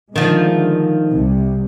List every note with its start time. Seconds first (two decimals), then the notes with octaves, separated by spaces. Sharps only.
0.16 D3 D#3 F3 G#3 A3
1.10 C2 C3